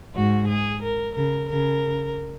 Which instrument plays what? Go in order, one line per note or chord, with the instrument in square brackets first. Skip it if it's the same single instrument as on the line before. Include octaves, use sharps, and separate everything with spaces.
[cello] G#2 [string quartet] F#4
[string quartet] G#4
A#4
[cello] C#3 [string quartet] A#4
[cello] C#3 [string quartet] A#4